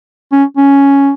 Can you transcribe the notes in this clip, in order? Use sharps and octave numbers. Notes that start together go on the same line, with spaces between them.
C#4
C#4